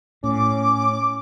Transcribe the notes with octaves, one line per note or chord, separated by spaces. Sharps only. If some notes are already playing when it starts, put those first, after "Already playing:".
A2 C#4 D6